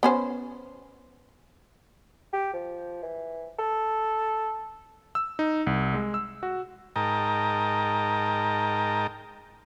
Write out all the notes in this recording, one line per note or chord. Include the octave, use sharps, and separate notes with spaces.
B3 C#4 C5
G4
F3
E3
A4
E6
D#4
C2
G#3
E6
F#4
G#2 A#4 D#5 G5 A5 A#5